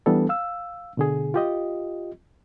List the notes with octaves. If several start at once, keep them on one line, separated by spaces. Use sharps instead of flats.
E3 G3 B3 D4 A4
F5 E6
B2 D3 G#4
F4 G4 D#5